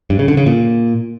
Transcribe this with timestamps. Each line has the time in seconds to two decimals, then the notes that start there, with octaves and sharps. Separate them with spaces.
0.10 G2
0.19 C#3
0.28 D3
0.37 C#3
0.46 A#2